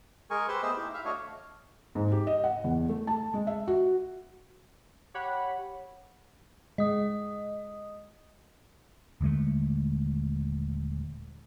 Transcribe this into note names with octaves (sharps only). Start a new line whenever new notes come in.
G#3 G#4 A#4 G#5 C#6
G4 B4 C5 C6 E6
A3 B3 G#4 C5 D#5 E6
D#4 E4 G4
E5 F5
A3 D4 F#4 C#5 D#5 F5
G#2
G4
D#5
F#5
E2
A3
A5
G#3
E5
F#4
G4 C#5 F#5 B5
G#3 D#5 D#6
D#1 D3 G#3 A3